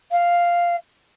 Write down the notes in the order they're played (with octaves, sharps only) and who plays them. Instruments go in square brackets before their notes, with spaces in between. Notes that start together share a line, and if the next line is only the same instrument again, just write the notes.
[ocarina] F5